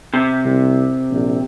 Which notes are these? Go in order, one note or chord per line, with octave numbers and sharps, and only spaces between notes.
C3
C2
A#1